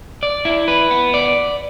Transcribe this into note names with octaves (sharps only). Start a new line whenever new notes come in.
D5
E4
B4
B3
D5